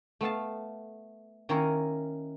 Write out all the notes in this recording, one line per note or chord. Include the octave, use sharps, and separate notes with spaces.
A3 B3 F5 A5
D#3 A#3 C#4 E4 A#4 C#5